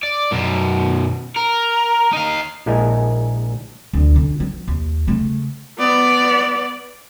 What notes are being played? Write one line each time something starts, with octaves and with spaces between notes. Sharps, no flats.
D5
F#2 B2
A#4
D#4 F5
A#1 G#3 E4 A#4 D#5 G#5
D2
D3 C#4
F3
D#2
C#3 A3
B3 D5